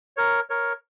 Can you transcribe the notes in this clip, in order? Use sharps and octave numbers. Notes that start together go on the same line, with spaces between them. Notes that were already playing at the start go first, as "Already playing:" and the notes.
A#4 C#5
A#4 C#5